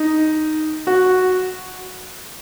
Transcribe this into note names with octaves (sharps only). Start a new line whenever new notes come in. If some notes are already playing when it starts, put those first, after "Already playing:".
Already playing: D#4
F#4